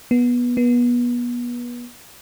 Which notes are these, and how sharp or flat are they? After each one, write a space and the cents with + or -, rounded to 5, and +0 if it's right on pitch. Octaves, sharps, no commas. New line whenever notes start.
B3 -20
B3 -30